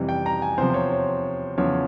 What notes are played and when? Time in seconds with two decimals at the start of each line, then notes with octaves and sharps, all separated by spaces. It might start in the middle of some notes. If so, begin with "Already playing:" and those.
Already playing: F2 C3 E3 G3
0.09 G5
0.26 A#5
0.42 G#5
0.58 E2 C3 F3 C5
0.74 C#5
0.92 C#5
1.57 E2 C#3 F3 C#5